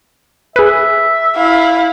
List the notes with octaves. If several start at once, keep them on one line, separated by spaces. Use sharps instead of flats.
G#4 B4 E5
E4 F5